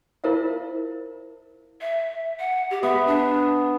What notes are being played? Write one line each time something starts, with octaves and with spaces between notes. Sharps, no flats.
E4 F4 A#4 C5 E5 F5
E5
F#5
G4
B3 E5
D4